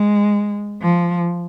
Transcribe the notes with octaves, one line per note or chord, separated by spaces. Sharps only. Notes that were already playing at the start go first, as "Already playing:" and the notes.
Already playing: G#3
F3